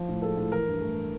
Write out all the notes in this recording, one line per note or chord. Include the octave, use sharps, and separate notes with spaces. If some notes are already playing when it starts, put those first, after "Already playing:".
Already playing: F3
A2
G#3 A4
A2
E3 A#4
G2
A3